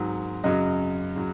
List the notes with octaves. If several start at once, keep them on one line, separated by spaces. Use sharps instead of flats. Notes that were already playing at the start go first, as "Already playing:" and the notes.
Already playing: G#2 D#3 F#3
F#2 C#3 F#3 D#5
C#3 F#3